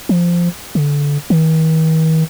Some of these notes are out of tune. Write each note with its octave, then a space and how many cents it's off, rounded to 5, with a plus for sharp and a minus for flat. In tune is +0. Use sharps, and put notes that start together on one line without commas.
F3 -10
D3 -20
D#3 +45